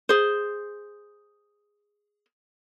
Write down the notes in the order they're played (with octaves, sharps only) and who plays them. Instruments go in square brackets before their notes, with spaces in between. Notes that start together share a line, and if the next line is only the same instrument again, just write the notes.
[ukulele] G#4 C5